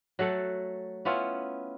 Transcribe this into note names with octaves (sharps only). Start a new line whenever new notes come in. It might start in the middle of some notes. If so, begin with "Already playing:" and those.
F#3 A3 A4 F#5
B3 C#4 E4 F4